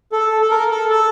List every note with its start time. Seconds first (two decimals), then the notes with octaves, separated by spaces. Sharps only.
0.12 A4
0.41 A4
0.51 A#4
0.71 A4
0.90 A4